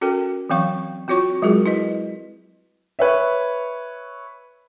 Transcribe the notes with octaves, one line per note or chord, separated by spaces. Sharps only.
C#4 F#4 A4 A#4 G5
E3 F#3 C4 F5 C#6
C4 F4 F#4 C#5 C#6
F#3 G#3 F4 F#4 G#4 A#4
E4 B4 D#5
B4 C#5 E5